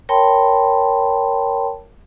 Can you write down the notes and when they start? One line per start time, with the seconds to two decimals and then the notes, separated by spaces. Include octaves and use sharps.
0.09 A#4 C#5 G5 A5 B5 C6